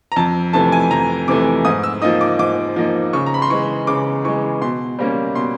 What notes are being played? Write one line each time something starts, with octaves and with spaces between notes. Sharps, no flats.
A#5
F2 A5
C3 E3 A3 A5
G#5
F2 A#5
C3 E3 A3 D6
G#2 D#6
E6
F3 A#3 D#4 D#6
D6
G#2 D6
F3 A#3 D#4
C#3 C#6
A#5
B5
C6
E3 G#3 C#6
C#3 D6
E3 G#3 C#6
B2 C6
G3 A#3 C#4
B2 C6